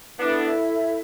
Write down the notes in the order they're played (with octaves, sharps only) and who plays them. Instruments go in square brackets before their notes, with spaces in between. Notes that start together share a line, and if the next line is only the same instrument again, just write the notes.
[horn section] B3 D4 [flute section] E4 A4 E5